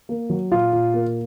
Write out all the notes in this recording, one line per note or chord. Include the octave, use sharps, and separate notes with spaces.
A#3
F#3
A#2 F4
A#2
A#3